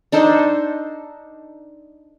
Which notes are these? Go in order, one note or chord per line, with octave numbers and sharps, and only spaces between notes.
D4 D#4 A4 C5